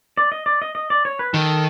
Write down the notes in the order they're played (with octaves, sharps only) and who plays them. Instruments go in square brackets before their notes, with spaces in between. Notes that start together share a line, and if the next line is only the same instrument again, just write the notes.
[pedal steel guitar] D5
D#5
D5
D#5
D#5
D5
C#5
B4
[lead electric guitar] D#3 [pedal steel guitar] A4